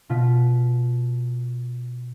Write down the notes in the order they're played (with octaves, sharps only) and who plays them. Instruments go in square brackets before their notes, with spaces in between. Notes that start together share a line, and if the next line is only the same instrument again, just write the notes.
[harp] B2 F4 B6